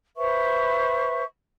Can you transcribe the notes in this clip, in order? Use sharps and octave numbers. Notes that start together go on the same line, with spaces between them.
B4 C5 E5 C#6